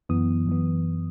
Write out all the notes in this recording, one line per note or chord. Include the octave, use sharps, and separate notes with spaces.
F#2 E3 B3 D#6
F#2 E3 B3